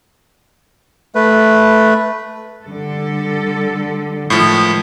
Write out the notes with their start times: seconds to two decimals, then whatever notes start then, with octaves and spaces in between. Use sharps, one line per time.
1.15 A3 B4
2.64 D3 G3 A4
4.30 A2 D#3 F3 G#3